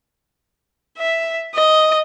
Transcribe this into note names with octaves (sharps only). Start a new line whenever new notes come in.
E5
D#5